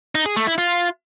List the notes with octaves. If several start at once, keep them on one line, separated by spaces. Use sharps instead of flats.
D#4
G#4
A3
E4
F4